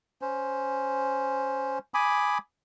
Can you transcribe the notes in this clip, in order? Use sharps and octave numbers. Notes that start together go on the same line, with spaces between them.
C#4 C5
G#5 B5 D6 D#6